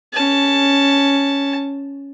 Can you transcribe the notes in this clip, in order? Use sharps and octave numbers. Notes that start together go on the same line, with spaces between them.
C#4 A5